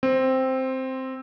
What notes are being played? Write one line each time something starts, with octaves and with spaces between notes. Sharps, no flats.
C4